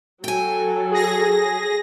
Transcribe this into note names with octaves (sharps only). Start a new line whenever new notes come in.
F#3 A4 G5 G#5
G#4 A#6